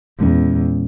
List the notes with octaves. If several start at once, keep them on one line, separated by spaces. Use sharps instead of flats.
E2 A#2 G#3 C#4